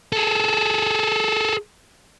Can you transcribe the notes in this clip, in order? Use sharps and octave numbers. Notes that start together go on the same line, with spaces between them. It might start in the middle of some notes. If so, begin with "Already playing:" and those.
G#4 A4